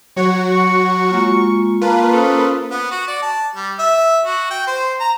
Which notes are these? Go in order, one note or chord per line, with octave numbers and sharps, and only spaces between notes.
F#3 F#4 C#5
C#6
G#3 A#3 F4
A#3 F4 B4 F5 A5 A#5
C#4 A4 C5 D#6
B3
F#4
D5
A5
G3
E5
F#4
G5
C5
A#5